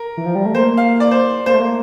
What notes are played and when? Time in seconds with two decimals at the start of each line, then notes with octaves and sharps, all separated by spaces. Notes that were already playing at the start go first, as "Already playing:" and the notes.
Already playing: A#4
0.17 E3
0.26 F3
0.35 G3
0.46 A3
0.54 A#3 C5
0.77 F5
1.00 D5
1.11 C5
1.46 A#3 C5
1.54 A3
1.61 A#3